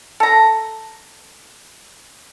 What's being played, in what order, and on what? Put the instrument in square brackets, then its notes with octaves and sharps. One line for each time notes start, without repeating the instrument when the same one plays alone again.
[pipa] A4 A#5